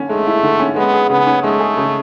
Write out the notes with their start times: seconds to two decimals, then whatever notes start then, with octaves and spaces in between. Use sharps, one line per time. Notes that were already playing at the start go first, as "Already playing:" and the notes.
Already playing: D3 C#4
0.09 G#3 A3
0.27 E4
0.43 D3
0.59 C#4
0.76 G#3 B3
0.93 G#4
1.10 C#3 B3
1.26 C#4
1.43 G#3 A3
1.60 G#4
1.77 C#3